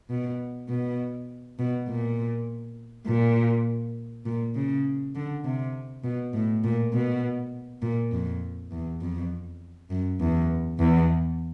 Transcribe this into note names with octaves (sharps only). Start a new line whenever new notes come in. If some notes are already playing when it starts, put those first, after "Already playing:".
B2
B2
B2
A#2
A#2
A#2
C#3
D3
C3
B2
A2
A#2
B2
A#2
F2
E2
F2
F#2
E2
E2